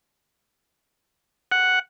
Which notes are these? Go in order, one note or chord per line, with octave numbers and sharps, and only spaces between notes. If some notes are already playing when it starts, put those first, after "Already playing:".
F#5